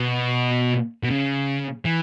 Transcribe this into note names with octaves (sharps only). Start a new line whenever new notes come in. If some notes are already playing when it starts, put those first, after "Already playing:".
Already playing: B2
B2
C#3
E3